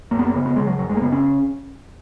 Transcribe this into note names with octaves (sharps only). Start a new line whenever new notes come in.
F#2 A#3
B3
A#3
C#3 B3
B3
C#3 G#3
F#3
F#2 F#3
G#3
A#3
C#3 B3
C#4